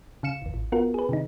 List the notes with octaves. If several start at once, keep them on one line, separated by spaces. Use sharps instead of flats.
C#3 F5 C#7 E7
G#1 D#2
A1
B3 F4 F#4 A#4
G#4 B4
C3 D#3 D#4